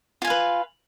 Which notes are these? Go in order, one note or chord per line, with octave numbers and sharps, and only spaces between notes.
F4 B4 F5 G#5